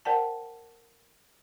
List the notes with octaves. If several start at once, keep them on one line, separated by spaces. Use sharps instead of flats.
A#4 C5 D5 F#5 G5 A5